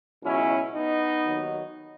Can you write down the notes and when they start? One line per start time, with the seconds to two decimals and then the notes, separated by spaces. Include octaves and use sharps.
0.23 C#2 B2 F#3 C#4 E4
0.74 B3 D#4
1.26 D#2 D#3 F#3